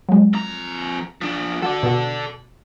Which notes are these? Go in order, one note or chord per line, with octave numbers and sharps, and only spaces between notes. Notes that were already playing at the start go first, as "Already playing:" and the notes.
F#3 G#3
F2 A#5
F3 D4
F#4 A4 D5
B2 F#4